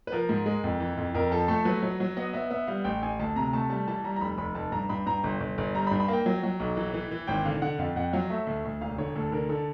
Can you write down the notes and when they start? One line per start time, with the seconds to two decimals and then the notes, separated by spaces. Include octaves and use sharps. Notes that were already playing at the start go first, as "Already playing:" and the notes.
0.07 B4
0.12 F3 A#4
0.29 G#2
0.46 G#3
0.64 F2
0.80 E3
0.97 F2
1.14 F2 A#4
1.31 F3 A4
1.48 A3 A4
1.65 F#3 B4
1.83 F#3
2.00 F#3
2.16 B3 D#5
2.33 B3 E5
2.51 B3 E5
2.67 G3 F5
2.84 A1 G5
3.02 A1 G#5
3.20 D2 A5
3.36 C3 A#5
3.53 A3 A5
3.70 G3 A5
3.88 E3 A5
4.04 G3 A#5
4.16 A#5
4.21 F1 B5
4.38 F1 B5
4.55 F1 A5
4.72 G2 A#5
4.89 G2 B5
5.06 G2 A#5
5.24 G1
5.40 G1
5.58 G1
5.74 G3 A#5
5.87 B5
5.91 G2
6.00 B5
6.08 A#3 G5
6.26 F#3
6.43 F#3
6.60 B1
6.77 E3
6.94 E3
7.11 E3
7.27 G#1 G5
7.45 D3 F5
7.62 D3 F#5
7.79 F2 F5
7.96 F2 F#5
8.13 F#3 F5
8.30 A3 E5
8.47 D2
8.65 D2
8.81 E1 F5
8.98 D3 C#5
9.16 D2 A4
9.32 D3 A#4
9.49 D3 A4